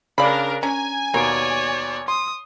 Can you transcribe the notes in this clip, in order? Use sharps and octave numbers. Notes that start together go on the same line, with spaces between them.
C#3 D4 A#4 D5 F5 B5
C#4 G#5 A#5
D#2 B2 A#3 C#5 D5 D7
C6 D#6